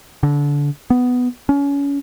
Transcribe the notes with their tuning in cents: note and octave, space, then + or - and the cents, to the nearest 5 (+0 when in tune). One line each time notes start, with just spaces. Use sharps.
D3 -25
B3 +5
C#4 +30